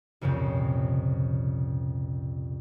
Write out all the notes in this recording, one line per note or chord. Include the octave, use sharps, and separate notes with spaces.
C2 F2 A#2 C#3 C4